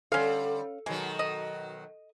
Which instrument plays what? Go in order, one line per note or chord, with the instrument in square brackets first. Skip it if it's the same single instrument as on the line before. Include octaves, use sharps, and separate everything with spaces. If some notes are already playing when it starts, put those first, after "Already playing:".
[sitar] D3 G3 [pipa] C#4 F5 [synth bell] A4
[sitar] B2 D#3 F#3 [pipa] G#3
[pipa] D#5